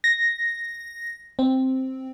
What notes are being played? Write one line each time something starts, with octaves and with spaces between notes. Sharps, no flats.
A#6
C4